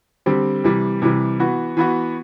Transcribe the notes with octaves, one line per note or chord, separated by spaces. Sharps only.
D3 G3 C4 G4
C3 E3 G3
C3 E3 G3
E3 B3 F#4
E3 B3 F#4